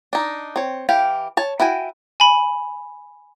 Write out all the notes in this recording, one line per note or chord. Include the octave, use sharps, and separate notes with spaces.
D4 D#4
C4 C#5
E3 G4 F5 G5
C#5 A5
E4 F#4 G5 G#5
G#5 B5